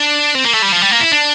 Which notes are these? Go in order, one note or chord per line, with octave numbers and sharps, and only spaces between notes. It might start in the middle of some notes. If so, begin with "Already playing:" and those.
Already playing: D4
C4
A#3
A3
G3
F3
G3
A#3
E4
D4